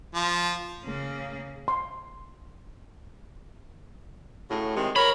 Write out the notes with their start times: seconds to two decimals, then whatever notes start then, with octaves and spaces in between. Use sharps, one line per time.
0.14 F3
0.85 C#3 A#3
1.68 C6
4.50 A2 C#3 F#4
4.75 C3 D#3 G#3
4.96 A#4 C#5 B5